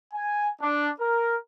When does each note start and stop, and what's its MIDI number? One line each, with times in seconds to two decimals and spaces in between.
0.14 0.51 80
0.62 0.91 62
1.01 1.36 70